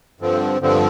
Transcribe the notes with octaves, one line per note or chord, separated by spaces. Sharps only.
G2 D3 F3 C4
G2 D3 F3 C4